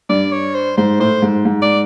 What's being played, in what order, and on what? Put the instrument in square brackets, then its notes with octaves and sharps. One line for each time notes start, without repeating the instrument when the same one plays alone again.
[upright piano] G2 [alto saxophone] D5
[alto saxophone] C#5
C5
[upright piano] G#2 [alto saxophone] C5
[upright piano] A2 [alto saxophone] C5
[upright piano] G#2
G#2
[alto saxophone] D5